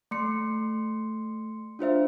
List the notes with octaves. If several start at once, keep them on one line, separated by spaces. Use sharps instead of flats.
A3 C6 C#7
D4 F4 C5 E5